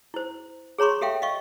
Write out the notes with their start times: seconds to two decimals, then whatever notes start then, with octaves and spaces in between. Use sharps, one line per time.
0.14 E4 C5
0.78 G#4 C#5 A#5 C6 C#6
1.01 G4 A4 E5 F5 G5
1.22 D#5 F5 C#6